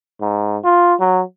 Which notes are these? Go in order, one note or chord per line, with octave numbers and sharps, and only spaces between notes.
G#2
F4
F#3